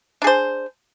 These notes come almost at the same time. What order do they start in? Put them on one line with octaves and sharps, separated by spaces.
D4 G#4 C5